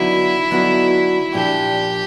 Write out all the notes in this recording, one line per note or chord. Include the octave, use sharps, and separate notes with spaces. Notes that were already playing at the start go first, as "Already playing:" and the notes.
Already playing: D3 F#3 B3 D#4 E4 F#4
D3 F#3 B3 D#4 F#4
A#2 F3 A#3 D4 G4